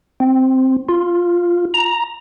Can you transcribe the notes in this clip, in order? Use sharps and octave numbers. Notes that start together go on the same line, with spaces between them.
C4
F4
A#5